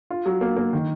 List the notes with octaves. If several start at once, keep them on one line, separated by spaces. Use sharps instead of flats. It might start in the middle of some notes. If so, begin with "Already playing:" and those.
F4
F#3
A#3
A#3
D#3